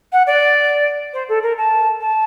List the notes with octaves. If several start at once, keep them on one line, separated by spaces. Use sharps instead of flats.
F#5
D5
C5
A4
A#4
A5
A5